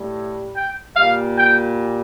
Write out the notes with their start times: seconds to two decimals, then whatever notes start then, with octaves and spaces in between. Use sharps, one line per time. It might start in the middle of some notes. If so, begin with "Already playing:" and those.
Already playing: A2 G3
0.55 G5
0.95 A#2 G3 F5
1.38 G5